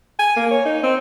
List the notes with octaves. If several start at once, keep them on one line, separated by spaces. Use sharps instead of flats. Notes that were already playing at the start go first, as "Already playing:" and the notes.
G#5
A#3
C#5
D#4
C4